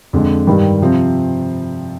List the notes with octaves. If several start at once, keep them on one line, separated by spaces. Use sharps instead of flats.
F2 D3 G#3
G2 D#3 G3
C3 F3 C4